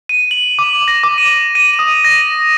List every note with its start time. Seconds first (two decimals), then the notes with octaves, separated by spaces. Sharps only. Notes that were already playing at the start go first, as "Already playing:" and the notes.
0.09 D#7
0.31 F#7
0.59 D6
0.88 A#6
1.03 D6
1.18 D#7
1.55 D#7
1.79 D#6
2.04 A#6